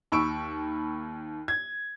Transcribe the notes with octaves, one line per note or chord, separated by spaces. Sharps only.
D#2 B5 C#6 E6 D7
G#6